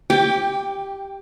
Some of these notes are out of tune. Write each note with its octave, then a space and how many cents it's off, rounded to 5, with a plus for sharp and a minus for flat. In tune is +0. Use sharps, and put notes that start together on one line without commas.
G4 +0 G5 +20 D6 -30